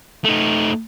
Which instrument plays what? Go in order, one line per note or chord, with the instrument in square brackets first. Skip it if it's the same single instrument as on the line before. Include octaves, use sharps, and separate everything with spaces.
[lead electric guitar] A3 D#4